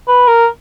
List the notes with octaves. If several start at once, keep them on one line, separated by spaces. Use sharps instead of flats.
B4
A#4